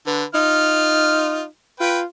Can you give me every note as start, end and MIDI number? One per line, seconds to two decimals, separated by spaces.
0.07 0.24 50
0.07 0.25 71
0.35 1.45 63
0.35 1.43 65
0.35 1.43 89
1.80 2.04 65
1.80 1.99 71
1.80 1.99 79